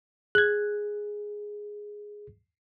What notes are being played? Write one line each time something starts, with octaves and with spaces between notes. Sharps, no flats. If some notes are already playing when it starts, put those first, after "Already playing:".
G#4 F#6 G#6